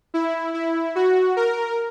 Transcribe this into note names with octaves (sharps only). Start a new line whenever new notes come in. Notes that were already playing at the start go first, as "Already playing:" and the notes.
E4
E4
F#4
A#4